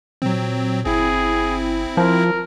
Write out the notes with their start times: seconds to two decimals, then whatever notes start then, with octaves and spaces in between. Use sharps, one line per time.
0.22 A#2 F#3 C4
0.86 G1 C4 E4 G#4
1.97 F3 A#4